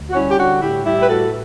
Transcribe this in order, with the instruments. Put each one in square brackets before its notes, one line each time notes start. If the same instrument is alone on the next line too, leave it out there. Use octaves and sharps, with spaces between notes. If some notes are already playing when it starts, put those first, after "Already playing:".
Already playing: [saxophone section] D2
F#4
G3 C#4 E4
G4
D3 D4 F#4
A2 E4 G4
G3 E4 G4
B4
A2 F#4 A4